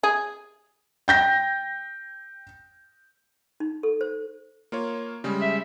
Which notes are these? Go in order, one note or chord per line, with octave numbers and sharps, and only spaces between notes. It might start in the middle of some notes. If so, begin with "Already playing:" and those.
G#4
G5 G6 A#6
D#4
A4
C5
A#3 F4 C#5
C#3 G3 G#3
E5